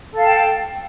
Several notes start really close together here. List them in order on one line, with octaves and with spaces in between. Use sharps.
A4 F5 A5 G5